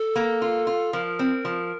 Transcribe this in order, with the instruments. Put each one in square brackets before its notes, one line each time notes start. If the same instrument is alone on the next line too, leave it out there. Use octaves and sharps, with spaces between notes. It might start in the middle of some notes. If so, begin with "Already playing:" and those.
Already playing: [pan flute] A4
[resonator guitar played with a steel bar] A#3
F4
F4
[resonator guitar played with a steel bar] F3 [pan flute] A#4
[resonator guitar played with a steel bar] C4
F3